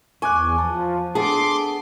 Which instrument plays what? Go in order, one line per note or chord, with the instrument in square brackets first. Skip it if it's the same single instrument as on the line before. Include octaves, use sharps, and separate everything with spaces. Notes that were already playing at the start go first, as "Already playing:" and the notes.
[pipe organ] E2 [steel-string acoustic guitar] G#5 [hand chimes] C#6 D6 F#6
[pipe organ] F3 [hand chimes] A5
[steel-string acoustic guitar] B3 G#4 [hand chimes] D4 A4 A5 [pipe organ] C6 D6